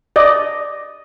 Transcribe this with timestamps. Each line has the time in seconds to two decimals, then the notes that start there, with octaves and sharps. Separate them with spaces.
0.16 D5 D#5